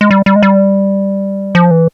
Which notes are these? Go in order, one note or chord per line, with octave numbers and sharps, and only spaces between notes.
G#3
G3
G3
G#3
G3
F3
E3